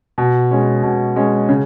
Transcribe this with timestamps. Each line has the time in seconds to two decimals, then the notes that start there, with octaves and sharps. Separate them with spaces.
0.18 B2
0.51 G#3 C#4
0.83 B2
1.16 G#3 C#4
1.49 C#3